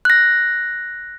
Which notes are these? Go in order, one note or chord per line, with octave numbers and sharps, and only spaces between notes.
F#6 A#6